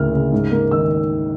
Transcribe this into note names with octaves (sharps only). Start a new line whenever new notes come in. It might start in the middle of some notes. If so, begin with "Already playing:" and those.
Already playing: D2 A2 C#3 A#3 F6
C#3
G#2
A#3
D#3 E6